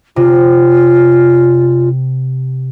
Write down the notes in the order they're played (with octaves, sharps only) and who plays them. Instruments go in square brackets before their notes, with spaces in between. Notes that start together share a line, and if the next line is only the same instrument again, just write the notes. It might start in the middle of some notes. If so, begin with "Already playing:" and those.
[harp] C3 [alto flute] F4